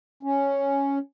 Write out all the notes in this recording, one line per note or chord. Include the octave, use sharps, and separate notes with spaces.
C#4